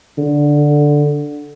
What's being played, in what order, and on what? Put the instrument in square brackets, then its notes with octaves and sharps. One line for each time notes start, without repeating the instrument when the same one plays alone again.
[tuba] D3